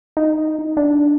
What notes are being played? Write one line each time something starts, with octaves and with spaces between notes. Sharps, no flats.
D#4
D4